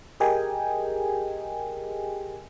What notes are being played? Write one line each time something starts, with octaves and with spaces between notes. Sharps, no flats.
G4 G#4 A#4 D#5 G5 G#5